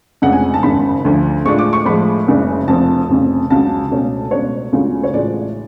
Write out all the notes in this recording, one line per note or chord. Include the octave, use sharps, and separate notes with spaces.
F1 F2 C#3 G#3 D4 F#5
G#5
A5
G#1 F#2 C#3 B5
D2 D3 F3
A2 G#3 D4 F4 C#6
D6
C#6
A2 F3 G#3 B5
F#1 F#2 C#3 G#3 D4
F1 F2 F3 A5
F1 F2 C#3
C#2 C#3 F#3 A5
C#2 B2 A3 C#4
C#2 B2 A3 D4 C#5
C#2 C#3 F#3 A3 F4
C#5
A1 A2 G#3 D4 F4 D5